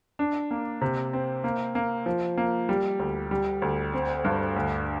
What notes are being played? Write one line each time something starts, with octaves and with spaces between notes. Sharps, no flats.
D4
A#3
C3
C4
A#3
A#3
F3
A#3
G3
D2
G3
D2
C4
G2
D2